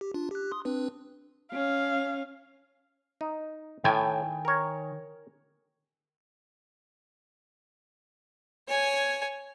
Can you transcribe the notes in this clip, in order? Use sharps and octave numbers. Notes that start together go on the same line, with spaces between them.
G4
D4 F4
G4 F#6
C6 D#6
C4 D4 B4
C#4 F5
D#4
A2 D#3 G5 G#5
A#4 C#5
C#5 G#5